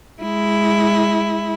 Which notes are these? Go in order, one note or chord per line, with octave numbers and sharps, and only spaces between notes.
G#3 E4